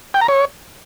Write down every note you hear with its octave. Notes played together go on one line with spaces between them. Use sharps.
G5
A#5
C#5